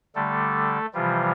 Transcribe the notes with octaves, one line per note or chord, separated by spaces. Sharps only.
D3 G3 A3 A4
C3 E3 F3 G3 F4